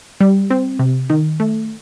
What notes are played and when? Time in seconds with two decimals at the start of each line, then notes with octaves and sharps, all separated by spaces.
0.20 G3
0.50 C4
0.79 C3
1.10 D#3
1.40 A3